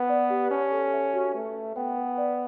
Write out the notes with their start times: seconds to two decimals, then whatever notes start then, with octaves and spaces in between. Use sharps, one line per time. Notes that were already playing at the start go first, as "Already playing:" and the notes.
Already playing: B3 B4 F#5
0.09 D5
0.30 G4
0.51 C#4 A5
0.72 A4
0.93 E5
1.13 F#4
1.34 A3 B4
1.56 E5
1.76 B3 G5
1.97 B4
2.18 D5